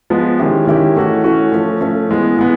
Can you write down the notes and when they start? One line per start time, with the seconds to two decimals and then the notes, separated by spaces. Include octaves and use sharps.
0.10 F3 G#3 B3
0.39 D#3 G#3 C#4 E4 G4
0.67 D#3 G#3 C#4 E4 G4
0.95 E3 A3 C#4 F#4
1.24 E3 A3 C#4 F#4
1.52 F3 A3 C#4
1.80 F3 A3 C#4
2.09 E3 G#3 B3
2.37 E3 G#3 B3